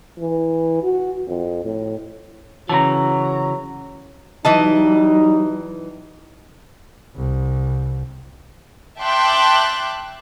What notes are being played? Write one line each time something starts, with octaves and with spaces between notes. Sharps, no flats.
E3
F#4
F2
A2
C#3 E3 F#3 A5 A#5
E3 F#3 G3 D#4 D#5 A5
C2
E5 G5 A5 C6 D6 F#6